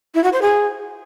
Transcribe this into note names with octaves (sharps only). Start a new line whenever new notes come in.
E4
F#4
C5
G#4